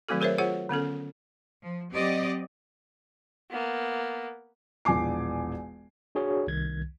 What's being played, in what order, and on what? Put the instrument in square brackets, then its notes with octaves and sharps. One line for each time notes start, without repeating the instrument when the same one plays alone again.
[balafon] D#3 F#3 A3 C4 F#4 A4
G#4 A#4 C5 C#5 E5
F4 G#4 C5 C#5 F#5
D3 B3 C#4 A4
[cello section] F3
F#3 C4 G4 D5 D#5
[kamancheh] A#3 B3
[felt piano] E1 A#1 G#5 D6 C7
[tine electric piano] D4 F#4 G#4 C#5
C2 D#3 G#6